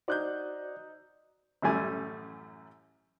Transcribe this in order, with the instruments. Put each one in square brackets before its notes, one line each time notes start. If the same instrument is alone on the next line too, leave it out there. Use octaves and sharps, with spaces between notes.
[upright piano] D#4 F#6 G6 [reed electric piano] F#4 C5 D5
[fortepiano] A1 F#2 G3 A3 G#5